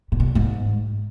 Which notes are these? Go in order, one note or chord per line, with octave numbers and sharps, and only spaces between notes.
A#2
B2
A#2
G#2